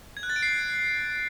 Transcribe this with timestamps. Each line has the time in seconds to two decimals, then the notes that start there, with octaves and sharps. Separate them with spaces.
0.17 G#6
0.23 F#6
0.30 A6
0.36 D7
0.43 C7